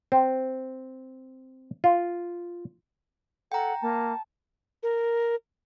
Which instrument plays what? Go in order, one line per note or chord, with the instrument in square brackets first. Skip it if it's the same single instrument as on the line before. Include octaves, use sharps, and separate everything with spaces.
[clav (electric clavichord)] C4
F4
[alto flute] A4 [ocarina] F#5 [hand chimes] G5 A#5
[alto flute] A#3 [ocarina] A5
[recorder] A#4